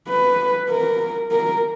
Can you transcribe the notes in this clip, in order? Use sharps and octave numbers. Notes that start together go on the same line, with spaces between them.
B4
A#4
A#4